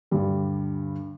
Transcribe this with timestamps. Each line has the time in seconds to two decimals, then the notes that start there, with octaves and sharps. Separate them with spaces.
0.11 D2 G2 D3 G3